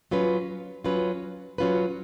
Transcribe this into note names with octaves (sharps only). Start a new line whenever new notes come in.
F#3 C#4 F4 B4
F#3 C#4 F4 B4
F#3 C#4 F4 B4